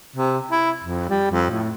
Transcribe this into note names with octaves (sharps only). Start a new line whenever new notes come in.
C3
E4
F2
G3
F2
A2